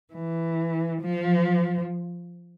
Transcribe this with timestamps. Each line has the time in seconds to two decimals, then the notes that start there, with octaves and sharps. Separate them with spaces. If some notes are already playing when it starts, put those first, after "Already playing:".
0.14 E3
1.01 F3